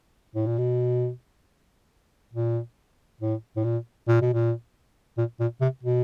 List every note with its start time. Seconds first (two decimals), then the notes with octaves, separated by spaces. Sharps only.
0.35 A2
0.47 A#2
0.58 B2
2.33 A#2
3.21 A2
3.56 A2
3.64 A#2
4.08 A#2
4.21 B2
4.33 A#2
5.18 A#2
5.40 A#2
5.61 C3
5.83 B2